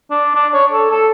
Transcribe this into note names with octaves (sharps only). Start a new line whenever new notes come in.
D4
D4
C#5
A4
A4